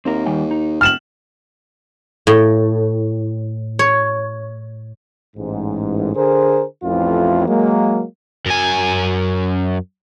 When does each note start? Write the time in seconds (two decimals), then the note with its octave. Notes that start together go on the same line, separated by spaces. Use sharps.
0.05 D#2 C4 A#4
0.26 D#3 G3 G5
0.51 D#4
0.81 E1 F6 E7 F#7
2.27 A2
3.79 C#5
5.36 A1 G#2
6.16 D3 G#4 A#4 C5
6.83 A1 F2 A2 E3 F4
7.47 F#3 G#3 A#3
8.46 F#2 G#5